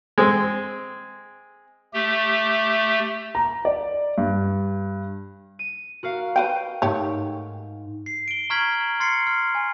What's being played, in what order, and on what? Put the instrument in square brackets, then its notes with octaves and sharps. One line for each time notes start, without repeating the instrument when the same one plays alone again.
[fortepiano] G#3 C4
[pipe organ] A3 G4
[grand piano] A#5
D5
G2
[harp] D#7
F#4 A#4 F5
[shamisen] B4 F5 G5 [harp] G6 D#7
[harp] G#2 [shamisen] A3 G4 C#5
[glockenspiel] C7
D7 G7
A#5 C#6 F6 G#6 B6 F#7
C6 F6 A6 C7 C#7
F6
G#5